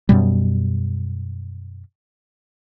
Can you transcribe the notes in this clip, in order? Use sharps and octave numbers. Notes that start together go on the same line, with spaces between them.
F#2 B2 G3